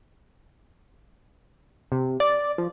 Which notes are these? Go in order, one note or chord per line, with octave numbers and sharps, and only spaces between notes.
C3
D5
F3